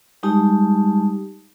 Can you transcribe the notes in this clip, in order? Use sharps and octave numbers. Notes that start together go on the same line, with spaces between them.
G3 G#3 D#4 G4 A5